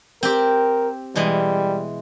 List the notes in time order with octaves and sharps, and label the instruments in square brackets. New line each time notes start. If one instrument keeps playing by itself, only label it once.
[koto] C4 G4 [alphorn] A#4
[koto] B2 E3 G#3 [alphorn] G3